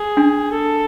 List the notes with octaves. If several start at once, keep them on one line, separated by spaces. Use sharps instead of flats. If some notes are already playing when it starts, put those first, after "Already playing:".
Already playing: G#4
D4
A4